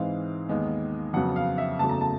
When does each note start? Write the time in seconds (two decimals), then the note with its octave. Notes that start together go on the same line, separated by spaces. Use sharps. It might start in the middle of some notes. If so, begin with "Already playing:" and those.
Already playing: G#2 E3 G#3 C4 F5
0.49 D#2 D#3 G#3 B3
1.13 F2 C#3 F#3 B3 F#5
1.36 F5
1.58 E5
1.79 F#1 E2 C#3 F#3 A3 A5
1.90 A#5
2.01 A5